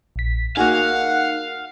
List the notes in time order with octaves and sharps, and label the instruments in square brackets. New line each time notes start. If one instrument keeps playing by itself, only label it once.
[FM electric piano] A#1 B6
[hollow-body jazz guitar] A#3 F#4 G#4 [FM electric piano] D#4 [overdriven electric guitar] F5 [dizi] F#5